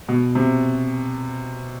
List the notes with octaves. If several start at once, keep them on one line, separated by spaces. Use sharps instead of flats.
B2
C3